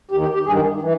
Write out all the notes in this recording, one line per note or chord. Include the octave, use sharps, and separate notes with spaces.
D#2 D#3 G4
G4
G4
G2 D#3 G#4
E3